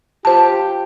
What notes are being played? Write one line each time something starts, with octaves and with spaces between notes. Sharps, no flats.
F4 G4 C5 A5